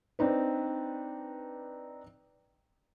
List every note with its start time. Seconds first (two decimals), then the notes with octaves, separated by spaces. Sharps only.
0.19 C4 D4 D#4 B4